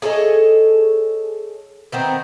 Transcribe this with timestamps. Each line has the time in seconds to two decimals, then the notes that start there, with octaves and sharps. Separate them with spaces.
0.02 G#4 A4 C#5 D#5
1.92 D#3 B3 C4